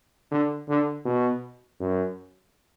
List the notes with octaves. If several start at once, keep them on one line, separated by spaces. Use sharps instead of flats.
D3
D3
B2
F#2